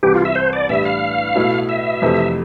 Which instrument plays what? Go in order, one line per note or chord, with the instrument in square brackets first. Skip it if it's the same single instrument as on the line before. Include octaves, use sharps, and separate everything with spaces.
[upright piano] C2 C3 E3 G3 [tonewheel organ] G4
[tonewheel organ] F4
E5
C5
D5
[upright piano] A2 E3 G3 D4 [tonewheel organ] E5
[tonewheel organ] F5
[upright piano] B2 A3 E4
[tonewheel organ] E5
[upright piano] F2 C3 E3 A3